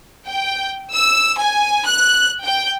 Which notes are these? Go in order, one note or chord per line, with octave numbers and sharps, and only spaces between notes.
G5
E6
G#5
F#6
G5